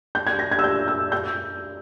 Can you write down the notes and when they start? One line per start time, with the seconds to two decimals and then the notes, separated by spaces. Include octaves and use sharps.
0.15 G6
0.27 G#6
0.39 A#6
0.51 G#6
0.59 E6
0.64 G6
0.88 E6
1.12 G6